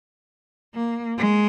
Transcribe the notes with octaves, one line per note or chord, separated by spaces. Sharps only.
A#3
G#3